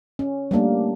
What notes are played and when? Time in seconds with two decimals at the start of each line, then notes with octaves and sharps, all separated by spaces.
0.19 C#4
0.51 G3 A3 A#3 D4